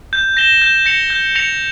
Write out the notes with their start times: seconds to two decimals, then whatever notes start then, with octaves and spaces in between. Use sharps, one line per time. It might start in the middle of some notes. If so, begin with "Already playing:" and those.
0.13 G6
0.37 A#6 E7 G7
0.62 G6
0.86 A#6 C#7 F7
1.10 G6
1.35 A#6 C#7 F7